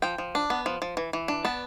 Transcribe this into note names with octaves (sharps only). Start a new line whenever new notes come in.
F3 G5
F3
D4
B3
F3
F3
E3
E3
D4
B3 A5